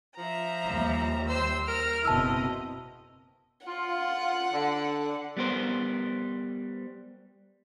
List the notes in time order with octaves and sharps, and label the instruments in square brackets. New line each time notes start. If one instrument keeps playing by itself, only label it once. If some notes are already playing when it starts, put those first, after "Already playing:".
[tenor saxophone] F3 [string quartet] E5 A#5
[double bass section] D#2 G3
[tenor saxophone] C5 [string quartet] E6
[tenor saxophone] A#4 [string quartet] F6
[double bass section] F#1 B2 C4 [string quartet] E4 D#5 [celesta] A5 E6
[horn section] F4 [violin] F#5
[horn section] D3
[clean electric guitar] G3 B3 A#4 C5